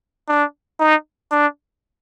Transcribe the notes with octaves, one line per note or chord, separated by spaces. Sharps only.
D4
D#4
D4